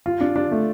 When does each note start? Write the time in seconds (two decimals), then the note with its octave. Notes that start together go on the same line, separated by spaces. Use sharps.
0.06 F4
0.21 D4
0.36 D4
0.51 A3